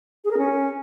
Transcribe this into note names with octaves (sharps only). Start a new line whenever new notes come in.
G#4
A#4
C#4